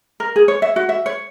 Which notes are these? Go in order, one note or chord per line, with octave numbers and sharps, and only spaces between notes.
A#4
G#4
C#5
E5
F#4
E5
C#5